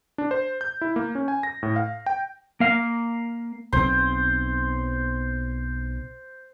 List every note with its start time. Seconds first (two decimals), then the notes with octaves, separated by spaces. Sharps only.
0.18 D4
0.31 C5
0.61 G6
0.81 E4
0.96 A#3
1.15 C#4
1.28 G#5
1.43 A#6
1.63 A2
1.76 F5
2.06 G5
2.60 A#3 F5
3.73 B1 D#3 C4 C5